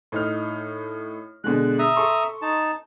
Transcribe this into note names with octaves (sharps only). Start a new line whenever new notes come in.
A2 D#4 F6
B2 D3 G#3 F#6
E5 A#5 D#6
A4 C6 C#6
D#4 A5